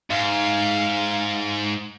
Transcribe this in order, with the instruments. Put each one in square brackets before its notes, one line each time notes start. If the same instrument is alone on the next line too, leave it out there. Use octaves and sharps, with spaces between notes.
[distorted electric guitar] G#2 [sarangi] F5